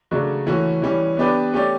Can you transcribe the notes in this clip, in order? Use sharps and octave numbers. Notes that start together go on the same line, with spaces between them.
C#3 F#3 A3 D4 F#4
E3 A3 C#4 F#4
E3 G3 C#4
B3 D4 G4 B4 D5
A3 C#4 G4 D5